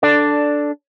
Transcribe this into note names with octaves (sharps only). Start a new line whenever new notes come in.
D4 A4 D5